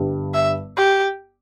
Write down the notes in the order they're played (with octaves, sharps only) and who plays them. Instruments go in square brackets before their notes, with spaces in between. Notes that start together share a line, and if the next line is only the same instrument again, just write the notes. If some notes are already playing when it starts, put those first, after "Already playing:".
Already playing: [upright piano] G1 G2 G3
[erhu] E5
G4